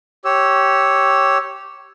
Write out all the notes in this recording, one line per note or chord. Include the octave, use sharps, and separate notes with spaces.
G4 C#5 E6